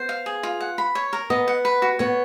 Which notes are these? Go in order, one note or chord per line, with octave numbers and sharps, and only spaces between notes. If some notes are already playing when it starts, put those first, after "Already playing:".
Already playing: B3 C5
F5
G#4
F4
F#5
B5
C#5
A#4
B3 D#5
F#5
B4
F#4
B3 C#5